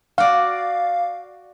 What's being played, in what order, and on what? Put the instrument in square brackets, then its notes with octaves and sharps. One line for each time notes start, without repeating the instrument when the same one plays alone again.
[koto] F#4 D5 [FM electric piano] F5